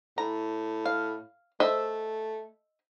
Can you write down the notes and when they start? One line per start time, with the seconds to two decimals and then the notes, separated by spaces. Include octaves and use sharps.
0.18 A2 A#5
0.86 F5
1.60 A3 C5 D#5 E5